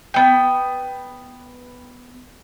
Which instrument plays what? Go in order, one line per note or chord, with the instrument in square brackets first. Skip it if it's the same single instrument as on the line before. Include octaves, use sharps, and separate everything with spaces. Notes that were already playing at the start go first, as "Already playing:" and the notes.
[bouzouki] B3 G5